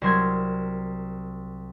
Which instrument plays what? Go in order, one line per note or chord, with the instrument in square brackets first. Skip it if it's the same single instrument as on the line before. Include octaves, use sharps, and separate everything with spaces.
[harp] C2 F#3 A#4 C6 G#6